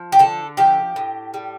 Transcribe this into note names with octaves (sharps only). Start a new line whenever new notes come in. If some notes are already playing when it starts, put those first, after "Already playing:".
Already playing: F3
G4
D3 A4
F3 G4
A2
G3